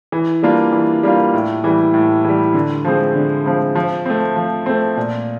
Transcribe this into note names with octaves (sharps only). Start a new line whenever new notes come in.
E3
G3 A#3 D4 F4
E3
G3 A#3 D4 F4
A2
E3 G3
A2
E3 G3
D3
F3 G#3 C4
D3
F3 G#3 C4
F3
A3 C4
F3
A3 C4
A#2